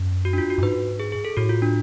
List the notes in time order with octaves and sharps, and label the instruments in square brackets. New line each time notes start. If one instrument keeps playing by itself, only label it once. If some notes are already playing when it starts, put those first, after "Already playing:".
Already playing: [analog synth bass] F#2
[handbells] F#4
D4
F4
F#4
[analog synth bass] F#2
[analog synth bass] G#2 [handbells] B4
[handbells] G#4
G#4
A4
[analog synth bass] A2 [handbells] F#4
[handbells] F4
D4